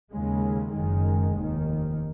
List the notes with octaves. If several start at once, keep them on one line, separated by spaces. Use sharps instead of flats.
D#2 C#3 G#3
F#1 F#2 D#3 G#3
F1 D#2 D#3